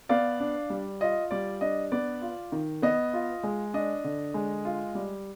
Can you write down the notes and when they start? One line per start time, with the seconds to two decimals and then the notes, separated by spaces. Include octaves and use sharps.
0.09 B3 D5 F5
0.40 D4
0.70 G3
1.01 F4 D#5
1.31 G3 D5
1.61 D4 D#5
1.92 B3 D5
2.22 F4
2.52 D#3
2.82 B3 D#5
3.13 F4
3.43 G#3
3.74 D4 D#5
4.04 D3
4.34 G#3
4.65 F4
4.95 G3